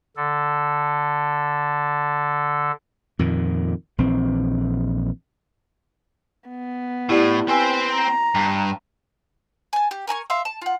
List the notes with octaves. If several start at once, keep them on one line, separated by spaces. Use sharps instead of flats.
D3 A4
F2 A#2 D#3
A#1 E3 C4
B3
A2 E4 G4 D5
C4 B4 C5 G5 G#5 E6
A#5
G2
G#5 A5
G4
A#4 G#5 A#5 C#6
E5 F5 C6
A5
F4 F#5